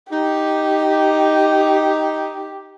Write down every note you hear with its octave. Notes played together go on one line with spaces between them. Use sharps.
D#4 G4